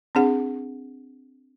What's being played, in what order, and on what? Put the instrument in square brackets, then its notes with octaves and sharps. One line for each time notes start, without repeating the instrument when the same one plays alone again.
[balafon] C4 D4 G#4 F#5